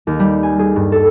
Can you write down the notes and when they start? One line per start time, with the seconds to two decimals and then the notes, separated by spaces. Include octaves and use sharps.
0.07 D#2
0.20 G3
0.43 G#5
0.59 G#4
0.76 G2
0.92 A4